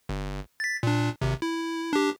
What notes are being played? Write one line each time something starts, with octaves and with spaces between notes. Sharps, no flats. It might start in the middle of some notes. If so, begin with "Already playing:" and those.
G1
A6 B6
A#2 D4
G#1 C3
E4
D4 G4